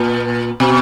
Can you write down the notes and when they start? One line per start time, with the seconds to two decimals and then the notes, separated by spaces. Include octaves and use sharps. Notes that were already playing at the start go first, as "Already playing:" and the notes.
Already playing: A#2
0.60 B2